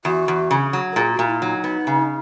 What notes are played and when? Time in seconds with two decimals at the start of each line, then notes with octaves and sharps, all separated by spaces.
0.05 E2 F#4
0.28 E2
0.51 C#3
0.73 F#3
0.92 A#4
0.96 A#2 G#4
1.11 F#4
1.19 A#2
1.27 E4
1.42 F#3 D#4
1.64 B3
1.87 C#3